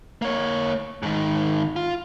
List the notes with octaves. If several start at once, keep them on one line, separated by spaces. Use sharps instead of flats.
A#3 C#5
G#2 D#3
F4